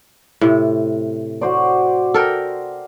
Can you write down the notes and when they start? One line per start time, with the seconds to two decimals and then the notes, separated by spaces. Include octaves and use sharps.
0.41 A2 C3
1.41 F#4 C5 D5
2.14 A4 A#4 G5